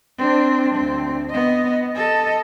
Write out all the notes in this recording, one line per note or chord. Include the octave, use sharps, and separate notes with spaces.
C4 D4
D2 C4
B3 D#5
A4 D#5